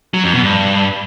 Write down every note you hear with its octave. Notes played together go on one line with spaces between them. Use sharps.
F#3
F2
B2
G2